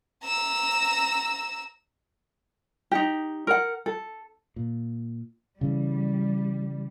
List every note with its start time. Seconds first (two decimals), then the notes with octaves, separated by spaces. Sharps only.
0.23 A#5 E6
2.91 D#4 G4
3.47 A#4 F#5
3.86 A4
4.56 A#2
5.61 C#3 E3 G3